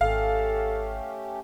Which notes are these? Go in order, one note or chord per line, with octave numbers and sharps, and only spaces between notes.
G#1 A3 C#4 G4 A4 F5